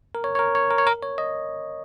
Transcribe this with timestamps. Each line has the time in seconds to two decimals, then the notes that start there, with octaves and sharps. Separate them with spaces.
0.15 A#4
0.24 C#5
0.35 C#5
0.39 A#4
0.55 C#5
0.71 A#4
0.78 C#5
0.87 A#4
1.02 C#5
1.18 D#5